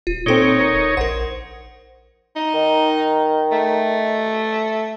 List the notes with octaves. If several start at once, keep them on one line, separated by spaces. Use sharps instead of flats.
D#1 F4
A#2 C4 D#4 A4 C#5 D7 G7
A#4
A#1 A#4 C5 F#5
D#4
D#3
A3